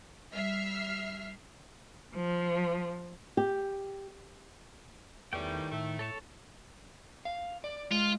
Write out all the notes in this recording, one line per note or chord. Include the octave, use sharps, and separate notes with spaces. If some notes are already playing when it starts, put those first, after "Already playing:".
G3 E5 F6 C7
F3
G4
E2 A2 D#3 E3 G3 G5
A2 A3
A4 C#5 A5
F5
D5
G#3 F4